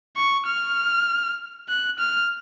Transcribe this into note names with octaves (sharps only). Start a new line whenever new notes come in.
C#6
F6
F#6
F6